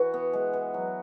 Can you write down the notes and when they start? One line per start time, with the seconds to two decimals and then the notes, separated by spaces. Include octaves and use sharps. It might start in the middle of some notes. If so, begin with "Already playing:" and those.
Already playing: E3 F#4
0.14 B3
0.33 G#3
0.53 E3
0.74 F#3